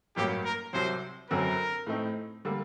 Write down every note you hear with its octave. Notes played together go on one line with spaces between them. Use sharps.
A1 G2 F#3 A#3 G4
A#4
C2 C3 F#3 C5
F#1 F#2 D3 F#3 C4 A#4
A2 A3 C4 D#4
D3 G3 A#3